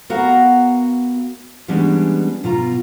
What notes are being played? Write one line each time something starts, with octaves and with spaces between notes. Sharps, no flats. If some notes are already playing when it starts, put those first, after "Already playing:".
B3 F#4 A#4 F5 F#5 A#5
E3 G3 G#3 B3 C#4 D4
B2 F4 A#5